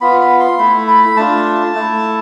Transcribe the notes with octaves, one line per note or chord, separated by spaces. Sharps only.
B3 F4 B5
B5
C6
A3 E4 B5
B5
A3 D4 F4 A5
A3 E4